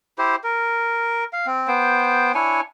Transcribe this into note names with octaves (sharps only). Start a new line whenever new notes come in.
E4 G4 C5
A#4
F5
C4
B3 C5 G5
D4 E4 C#5 G#5